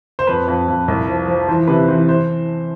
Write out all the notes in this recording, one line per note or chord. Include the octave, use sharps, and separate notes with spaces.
C5
F2 B4
F2
F2
C2
F3
F3
E3 C5
C3 B4
E3 C5
C5